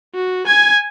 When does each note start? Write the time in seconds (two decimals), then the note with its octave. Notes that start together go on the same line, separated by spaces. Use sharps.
0.15 F#4
0.47 G#5 G#6